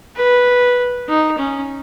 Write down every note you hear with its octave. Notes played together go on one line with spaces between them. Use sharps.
B4
D#4
C#4